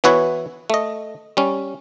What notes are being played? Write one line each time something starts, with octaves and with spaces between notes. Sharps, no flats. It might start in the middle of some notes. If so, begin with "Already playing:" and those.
E3 B3 E4 F#4 B4 C#5
A3 D#5
G3 C#4